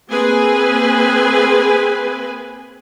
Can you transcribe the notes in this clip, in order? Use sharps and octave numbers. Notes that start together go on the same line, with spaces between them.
A#3 C4 G#4 B4 G#5